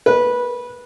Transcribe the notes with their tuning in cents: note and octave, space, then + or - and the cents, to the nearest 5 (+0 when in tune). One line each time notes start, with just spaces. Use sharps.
B4 -15